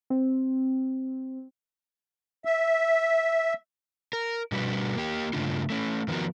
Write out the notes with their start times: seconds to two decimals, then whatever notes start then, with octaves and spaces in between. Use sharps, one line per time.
0.10 C4
2.45 E5
4.13 A#4
4.52 B2 G3 D4 F#4 B4
4.95 A#3 G4
5.33 G2 C#3 A3 D4 F4
5.70 A3 C#4
6.08 D#3 F3 B3 F#4 A#4